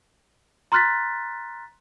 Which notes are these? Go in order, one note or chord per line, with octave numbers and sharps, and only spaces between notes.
A#5 C6 F6 F#6 A6 B6